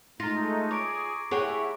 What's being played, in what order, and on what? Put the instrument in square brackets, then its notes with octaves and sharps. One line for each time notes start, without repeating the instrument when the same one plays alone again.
[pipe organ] G#3 A3 D#4 [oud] F4 [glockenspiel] A#5 A6 A#6
[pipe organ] G#4 [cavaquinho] C#5 [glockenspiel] D6 D7
[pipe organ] E4 [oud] G4 G#4 [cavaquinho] C#5 F#5